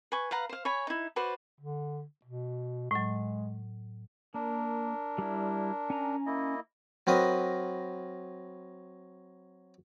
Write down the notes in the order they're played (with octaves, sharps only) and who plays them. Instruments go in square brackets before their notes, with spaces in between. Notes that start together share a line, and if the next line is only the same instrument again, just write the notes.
[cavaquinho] B4 G#5 C#6
B4 F5 F#5 A#5
C5 F5
C#5 G#5 B5
D#4 E4
F#4 B4 C5 D5
[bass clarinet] D3
B2
[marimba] A2 F#3 [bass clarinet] G#3
[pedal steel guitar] A#3 [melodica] D4 A#4
[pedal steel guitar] G3 E4
C#4 G#5 A#5
[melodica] A#3 E4 D#5
[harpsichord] F#3 C4 A#4 B4 D#5